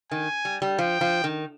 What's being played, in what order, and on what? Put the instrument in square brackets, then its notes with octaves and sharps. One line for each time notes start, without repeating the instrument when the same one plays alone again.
[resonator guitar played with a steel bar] D#3 [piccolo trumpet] G#5
[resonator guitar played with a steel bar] G3
G3
[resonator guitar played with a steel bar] F3 [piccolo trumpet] G5
[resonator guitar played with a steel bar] F3
D#3